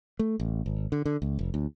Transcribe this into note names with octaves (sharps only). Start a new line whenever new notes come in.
A3
A1
G#1
D3
D3
C#2
F1
D2